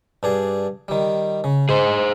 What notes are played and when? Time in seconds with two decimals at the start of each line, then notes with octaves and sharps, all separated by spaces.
0.23 G2 D4 G#4
0.88 D#3 G3
1.44 C#3
1.69 G#2 G#4 C5